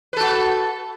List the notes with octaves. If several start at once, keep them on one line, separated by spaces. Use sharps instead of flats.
F#4 A4 B4